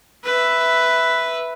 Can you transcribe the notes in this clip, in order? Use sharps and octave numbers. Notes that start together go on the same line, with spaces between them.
B4 E5